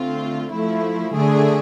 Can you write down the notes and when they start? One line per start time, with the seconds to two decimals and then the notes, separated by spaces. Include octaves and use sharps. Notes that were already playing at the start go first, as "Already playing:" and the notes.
Already playing: D3 A3 C4 F4
0.51 F3 A3 E4
1.13 D3 A3 D4 G#4